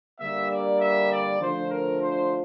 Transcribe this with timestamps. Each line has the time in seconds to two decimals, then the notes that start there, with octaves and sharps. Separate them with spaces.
0.20 D3 G3 A#3 E5
0.49 D5
0.80 E5
1.10 D5
1.40 D3 F3 A3 C5
1.70 A#4
2.00 C5